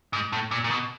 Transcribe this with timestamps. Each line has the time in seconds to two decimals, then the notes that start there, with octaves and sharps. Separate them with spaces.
0.13 G#2
0.33 A2
0.51 A#2
0.64 A#2
0.71 B2